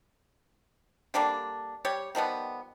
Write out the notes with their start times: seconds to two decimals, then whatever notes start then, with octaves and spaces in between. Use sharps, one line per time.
1.14 D3 G3 A#3 D4
1.85 G3 G4 C#5
2.15 D#3 F3 G3 B3